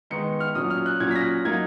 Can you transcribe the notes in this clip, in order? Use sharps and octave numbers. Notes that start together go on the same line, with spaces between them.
D#3 G#3 B3 D#4 C#7
F6
A#2 F#3 C#4 D#6
F6
F#6
A#2 F#3 C#4 G#6
B6
A#6
F#3 A#3 D#4 G#6